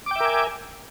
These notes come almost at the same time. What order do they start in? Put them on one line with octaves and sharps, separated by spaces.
D6 G5 E5 A#4 G#5